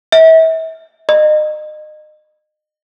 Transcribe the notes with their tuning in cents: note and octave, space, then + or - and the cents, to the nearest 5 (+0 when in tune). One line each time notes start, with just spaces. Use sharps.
E5 -35
D#5 -35